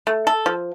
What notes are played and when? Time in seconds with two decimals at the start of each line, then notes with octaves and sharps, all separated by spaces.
0.07 A3
0.27 A4
0.46 F3